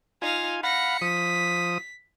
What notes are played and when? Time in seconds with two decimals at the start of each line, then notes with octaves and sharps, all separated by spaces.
0.22 D#4 F4 F5 G#5
0.63 F5 F#5 B5 A#6 C#7
1.02 F3 D#6 B6